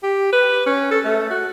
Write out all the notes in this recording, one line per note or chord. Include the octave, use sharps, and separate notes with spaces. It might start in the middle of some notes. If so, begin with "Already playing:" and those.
G4
B4
C#4
A4
A3
F#4